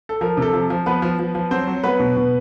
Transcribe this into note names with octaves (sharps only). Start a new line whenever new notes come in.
A4
F3 A#4
C3 A4
F3
F3
F3 B3 B4
F3
F3
F3
F#3 C4 C5
F#3
F#3 B3 B4
B2
B2